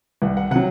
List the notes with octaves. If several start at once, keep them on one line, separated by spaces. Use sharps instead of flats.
C2 F#5
F#5
C3 F#3 F#5